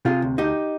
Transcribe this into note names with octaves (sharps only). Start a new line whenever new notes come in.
C3 F4 G#4
D2
D2 D#4 G4